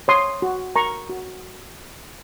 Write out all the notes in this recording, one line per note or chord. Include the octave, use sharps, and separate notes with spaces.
C#5 C6 D#6
F#4
A#4 A#5 C#6
F#4